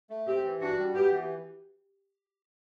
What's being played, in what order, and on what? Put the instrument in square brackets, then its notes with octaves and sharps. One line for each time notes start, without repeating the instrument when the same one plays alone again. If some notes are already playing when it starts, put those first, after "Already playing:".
[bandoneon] A3
[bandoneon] C4 [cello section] G4
[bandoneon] E3
[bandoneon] D4 [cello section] F#4
[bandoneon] G3
[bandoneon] B3 [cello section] G4
[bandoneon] E3